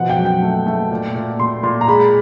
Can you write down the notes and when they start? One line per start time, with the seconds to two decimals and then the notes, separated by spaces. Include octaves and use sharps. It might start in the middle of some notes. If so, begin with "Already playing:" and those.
Already playing: B2 F3 F#5
0.10 G5
0.18 F#2
0.25 G5
0.42 A3
0.67 A3
0.91 A#2
1.15 A#2
1.39 A#2 C6
1.63 A#2 C6
1.81 A#5
1.88 G#3 B5